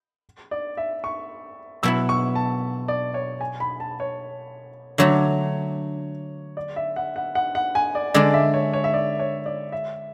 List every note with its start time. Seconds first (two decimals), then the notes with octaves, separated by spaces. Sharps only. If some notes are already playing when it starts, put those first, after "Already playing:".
0.51 D5
0.77 E5
1.04 C#6
1.83 B2 F#3 B3 E4 E6
2.09 C#6
2.35 A5
2.88 D5
3.14 C#5
3.41 G#5
3.60 B5
3.80 A5
4.00 C#5
4.98 D3 F#3 A3 C#5
6.57 D5
6.76 E5
6.96 F#5
7.16 F#5
7.35 F#5
7.55 F#5
7.75 G#5
7.95 D5
8.14 D3 G#3 D4 D5
8.34 E5
8.54 C#5
8.73 C#5
8.84 E5
8.94 D5
9.19 C#5
9.46 D5
9.72 E5